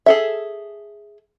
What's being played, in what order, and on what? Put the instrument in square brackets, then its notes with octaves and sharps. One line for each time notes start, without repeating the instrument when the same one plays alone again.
[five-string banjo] G#4 A4 E5